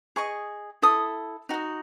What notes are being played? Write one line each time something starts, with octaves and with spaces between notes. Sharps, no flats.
G#4 D#5 C#6
E4 A4 D#6
D#4 F#4 D#5